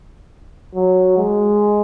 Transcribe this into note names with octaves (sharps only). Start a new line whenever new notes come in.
F#3
G#3